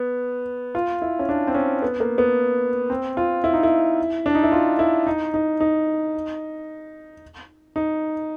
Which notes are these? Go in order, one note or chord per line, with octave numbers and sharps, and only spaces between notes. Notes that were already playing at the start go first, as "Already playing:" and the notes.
Already playing: B3
F4
E4
C#4
D4
C4
C#4
B3
A#3
B3
C4
F4
E4
D#4
E4
D4
D#4
E4
F4
E4
D#4
D#4
D#4
D#4